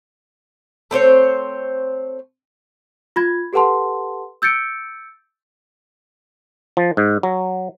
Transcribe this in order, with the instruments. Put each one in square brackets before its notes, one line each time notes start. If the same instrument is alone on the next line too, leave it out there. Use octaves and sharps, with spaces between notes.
[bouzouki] A3 C4 C5 C#5
[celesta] F4 B5 G#6
G4 A4 B4 F#5 A5 C6
E6 G6 A6 C#7 D7
[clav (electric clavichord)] F3
G#2
F#3